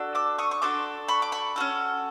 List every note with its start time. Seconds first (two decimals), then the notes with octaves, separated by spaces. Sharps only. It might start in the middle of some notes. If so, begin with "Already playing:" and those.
Already playing: D4 F#4 A4
0.15 D6 E6
0.38 C#6 D#6
0.51 C#6
0.62 D4 F#4 A4 C6 D6
1.08 B5 C#6
1.22 D6
1.32 B5 C#6
1.56 C#4 F#4 A4